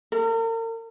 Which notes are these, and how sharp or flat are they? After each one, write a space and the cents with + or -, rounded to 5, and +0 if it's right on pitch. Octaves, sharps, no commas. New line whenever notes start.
A#4 -40